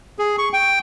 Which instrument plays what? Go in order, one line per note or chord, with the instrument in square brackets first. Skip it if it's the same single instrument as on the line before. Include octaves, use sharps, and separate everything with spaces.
[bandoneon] G#4
C#6
G5